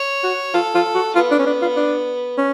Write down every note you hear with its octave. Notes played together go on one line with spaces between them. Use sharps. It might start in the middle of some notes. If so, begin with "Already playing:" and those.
Already playing: C#5
F#4
F4 A4
F4
F#4
B3 F4
D4
C#4
D4
F4
D4
C#4